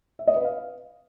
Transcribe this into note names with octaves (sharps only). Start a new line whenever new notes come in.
E5
D#5
B4
F5